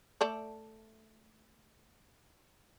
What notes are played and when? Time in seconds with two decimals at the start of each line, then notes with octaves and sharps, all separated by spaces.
0.21 A3 A4 D5